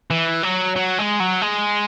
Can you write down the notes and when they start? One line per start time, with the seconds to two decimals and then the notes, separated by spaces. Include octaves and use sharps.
0.11 E3
0.43 F#3
0.76 F#3
0.98 G#3
1.20 F#3
1.42 G#3